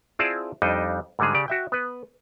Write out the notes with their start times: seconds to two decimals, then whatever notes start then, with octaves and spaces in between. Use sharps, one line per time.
0.19 C4 E4 F4 G#4 D5 A5
0.62 F2 G3 D4 D#4 D#5
1.19 G#2 D3 G3 G#3 G#4
1.34 C#3 G4 D5
1.48 F#4 E5 G5
1.72 B3 B4